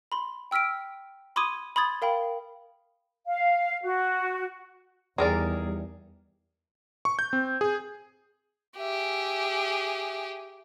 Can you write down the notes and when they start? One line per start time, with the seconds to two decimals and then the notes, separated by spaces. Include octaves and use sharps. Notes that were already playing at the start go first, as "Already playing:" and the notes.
0.12 B5 C6
0.51 G5 E6 F6 B6 D7
1.36 B5 C6 D6 D#6 G#6 D#7
1.76 B5 C6 D#6 G#6 A6
2.02 A#4 F5 G5 B5
3.27 F5
3.84 F#4
5.18 E2 D#3 G3 G#4 A#4 D5
7.05 C#6
7.19 G6
7.33 C4
7.61 G#4
8.78 G4 G#4 E5